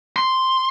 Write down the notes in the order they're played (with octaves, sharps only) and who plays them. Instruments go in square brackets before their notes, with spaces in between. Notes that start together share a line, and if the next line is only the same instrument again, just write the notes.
[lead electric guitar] C6